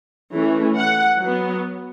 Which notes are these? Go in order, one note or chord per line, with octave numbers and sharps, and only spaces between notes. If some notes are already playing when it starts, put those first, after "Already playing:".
E3 A3 C#4
F#5
F#3 B3